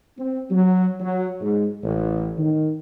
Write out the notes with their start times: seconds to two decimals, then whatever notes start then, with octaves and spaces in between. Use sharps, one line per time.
0.18 C4
0.51 F#3
1.00 F#3
1.41 G#2
1.83 A1
2.38 D#3